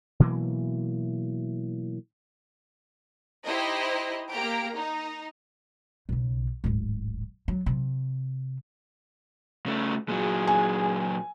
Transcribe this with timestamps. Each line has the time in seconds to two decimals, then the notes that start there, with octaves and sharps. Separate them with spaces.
0.20 B2 E3 F#3 A#3
3.45 D#4 E4 G4 C5 D#5
4.30 A#3 G4 A#5 D7
4.75 D#4
6.09 B1 C#3
6.64 D1 G#1
7.48 F#3
7.66 C3
9.66 C#3 A3
10.09 A#2 F#3 G#4
10.47 G#5